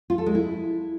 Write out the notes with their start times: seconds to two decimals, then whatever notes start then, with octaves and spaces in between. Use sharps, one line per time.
0.10 F4
0.18 A4
0.26 G#3
0.35 E4